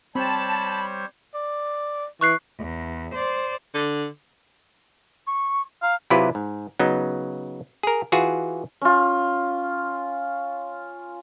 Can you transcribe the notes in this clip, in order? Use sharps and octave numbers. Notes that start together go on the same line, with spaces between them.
G3 C4 C5 C#5 A5 B5
D5
E3 C#6 F#6 C7
E2
C5 D5
D3
C#6
F5 A#5
C3 F#3 E4 F4 G4 B4
G#2
C#3 F#3 B3 D#4
G#4 A#4
E3 F4 F#4 G#4
C#4 F4